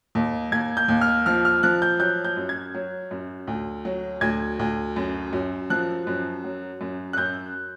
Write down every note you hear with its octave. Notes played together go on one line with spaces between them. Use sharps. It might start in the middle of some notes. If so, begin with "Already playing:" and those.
D#2
D#2 G#6
G6
D#2
F6
F3 F6
F6
F3 F#6
G6
F#3 G6
G6
F#2
G#6
F#3
F#2
D2
F#3
D2 G#6
D2
F#2
F#2
F3 F#6
F#2
F#3
F#2
F#6
F#2 G6